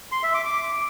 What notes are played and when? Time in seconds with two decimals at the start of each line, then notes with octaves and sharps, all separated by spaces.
0.12 C6
0.23 E5
0.34 D6
0.45 D6